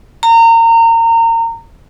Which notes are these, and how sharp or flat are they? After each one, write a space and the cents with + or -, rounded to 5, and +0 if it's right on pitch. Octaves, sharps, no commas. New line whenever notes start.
A#5 -30